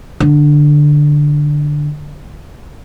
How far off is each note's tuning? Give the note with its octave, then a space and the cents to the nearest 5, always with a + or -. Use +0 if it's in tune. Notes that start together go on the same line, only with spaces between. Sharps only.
D3 +5